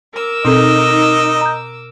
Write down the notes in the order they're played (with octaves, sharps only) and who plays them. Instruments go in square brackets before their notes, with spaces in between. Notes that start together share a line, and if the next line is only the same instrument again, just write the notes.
[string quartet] A#4 D6 E6
[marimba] B2 C4 A4 [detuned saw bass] D#4 [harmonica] D#5
[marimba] A#5 D#6 G6